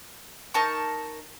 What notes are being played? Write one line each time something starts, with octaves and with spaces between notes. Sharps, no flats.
D#4 A#4 A5 C#6